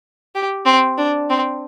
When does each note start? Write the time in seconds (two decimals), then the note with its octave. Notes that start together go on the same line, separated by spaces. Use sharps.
0.35 G4
0.66 C4
0.98 D4
1.29 C4